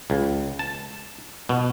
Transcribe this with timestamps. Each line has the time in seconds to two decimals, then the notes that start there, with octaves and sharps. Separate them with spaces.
0.10 C#2
0.59 A5
1.49 B2